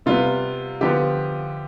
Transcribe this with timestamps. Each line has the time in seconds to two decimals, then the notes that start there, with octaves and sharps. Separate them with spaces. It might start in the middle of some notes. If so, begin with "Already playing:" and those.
0.06 C3 G3 B3 F4
0.81 D3 F3 B3 G4